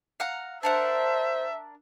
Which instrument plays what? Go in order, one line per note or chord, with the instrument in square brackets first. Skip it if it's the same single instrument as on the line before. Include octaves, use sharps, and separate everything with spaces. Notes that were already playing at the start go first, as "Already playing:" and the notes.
[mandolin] F5 F#5 A#5
[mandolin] D4 A#4 F#5 [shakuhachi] C5 [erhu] E5